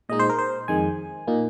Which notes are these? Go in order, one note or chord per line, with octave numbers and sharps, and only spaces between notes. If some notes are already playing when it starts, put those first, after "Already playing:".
A#2 G#3 D#4 D#5
C5
A#4
C5
F2 D#3 G#3 G#5
A#2 A#3 D#4